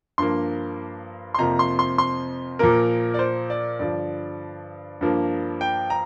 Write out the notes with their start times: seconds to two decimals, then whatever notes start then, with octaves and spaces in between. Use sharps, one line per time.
0.18 G2 F3 A#3 C6
1.34 C6
1.38 F2 C3 F3 A#3 A#5
1.59 C6
1.79 C6
1.98 C6
2.59 A#2 F3 A#3 A#4
3.14 D5
3.19 C5
3.50 D5
3.79 G2 D3 F3 D5
5.01 G2 F3 A#3
5.61 G5
5.90 A#5